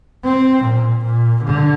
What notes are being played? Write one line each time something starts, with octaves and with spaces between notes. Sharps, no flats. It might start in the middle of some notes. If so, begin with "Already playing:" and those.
C4
A#2
A#2
D3